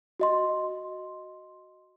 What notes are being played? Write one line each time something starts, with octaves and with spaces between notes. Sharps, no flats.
F#4 D#5 C6